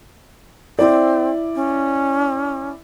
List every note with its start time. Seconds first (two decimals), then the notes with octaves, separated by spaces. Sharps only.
0.79 C4 E4 D5
1.55 C#4